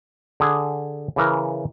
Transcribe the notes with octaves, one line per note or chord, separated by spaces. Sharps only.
D3 G#4
C#3 E3 A#4